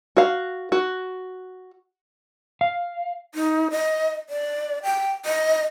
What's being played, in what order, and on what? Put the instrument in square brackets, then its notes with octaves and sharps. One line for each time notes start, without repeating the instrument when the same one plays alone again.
[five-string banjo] F#4 F5
F#4
[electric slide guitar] F5
[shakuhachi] D#4
D#5
D5
G5
D#5